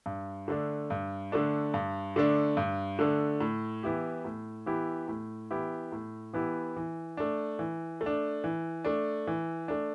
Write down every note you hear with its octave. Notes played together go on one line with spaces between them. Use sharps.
G2
D3 A3 D4
G2
D3 A3 D4
G2
D3 A3 D4
G2
D3 A3 D4
A2
E3 B3 E4 G4
A2
E3 B3 E4 G4
A2
E3 B3 E4 G4
A2
E3 B3 E4 G4
E3
A3 D4
E3
A3
D4
E3
A3 D4
E3
A3 D4